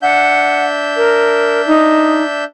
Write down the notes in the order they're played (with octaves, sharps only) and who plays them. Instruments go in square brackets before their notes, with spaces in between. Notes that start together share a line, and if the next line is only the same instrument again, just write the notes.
[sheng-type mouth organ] D4 E5 G6 [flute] F#5
[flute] A#4
D#4